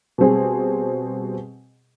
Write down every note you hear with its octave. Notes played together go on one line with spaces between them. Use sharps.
B2 G3 C4 G#4